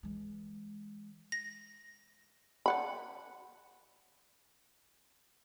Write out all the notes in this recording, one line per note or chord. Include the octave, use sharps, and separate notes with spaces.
E3 G#3
A#6
D5 F#5 B5